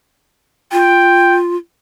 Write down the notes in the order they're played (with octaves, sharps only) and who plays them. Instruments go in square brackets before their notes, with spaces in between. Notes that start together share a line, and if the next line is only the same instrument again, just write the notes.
[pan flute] F4 [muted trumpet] G5